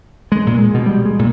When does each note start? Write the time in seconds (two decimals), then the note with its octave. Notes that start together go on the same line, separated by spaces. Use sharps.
0.32 G#3
0.47 A#2
0.59 G#3
0.74 B2
0.86 G3
1.06 G#3
1.19 A#2